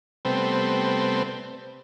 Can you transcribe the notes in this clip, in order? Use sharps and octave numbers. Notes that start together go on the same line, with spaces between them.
C3 G3 A3 B3 C4